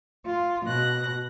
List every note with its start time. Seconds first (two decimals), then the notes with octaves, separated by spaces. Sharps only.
0.25 F4
0.66 B2 F#6 A#6